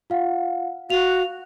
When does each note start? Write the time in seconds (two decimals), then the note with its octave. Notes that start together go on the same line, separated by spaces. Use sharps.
0.10 F4 F5 F#5
0.90 F#4 F5 F7